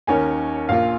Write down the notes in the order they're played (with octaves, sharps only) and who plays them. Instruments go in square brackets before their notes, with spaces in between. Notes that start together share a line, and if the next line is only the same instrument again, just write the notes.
[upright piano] D#2 D#3 C#4 A#4 C#5 [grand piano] G#5
[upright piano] A#1 A#2 A#3 F4 [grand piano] F5